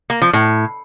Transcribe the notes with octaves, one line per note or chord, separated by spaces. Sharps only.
A#3
F3
A2